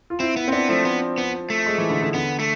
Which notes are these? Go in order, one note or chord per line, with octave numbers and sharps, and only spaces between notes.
F4
C4 E4
B3 E4
C4
B3 D4
F3 A3
B3
B3
A3
G#3
E3
D3
D3
D3 B3
A3